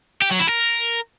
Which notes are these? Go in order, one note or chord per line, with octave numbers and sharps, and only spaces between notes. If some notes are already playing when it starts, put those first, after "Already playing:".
G4
F#3
E4
A#4